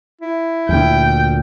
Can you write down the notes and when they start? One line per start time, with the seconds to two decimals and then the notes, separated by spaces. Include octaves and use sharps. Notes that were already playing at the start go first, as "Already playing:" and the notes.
0.21 E4
0.69 D2 A#2 G5